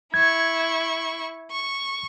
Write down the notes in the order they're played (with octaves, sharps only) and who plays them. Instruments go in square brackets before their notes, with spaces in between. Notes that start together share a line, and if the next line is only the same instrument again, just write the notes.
[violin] E4 C#6 [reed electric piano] G#6
[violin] C#6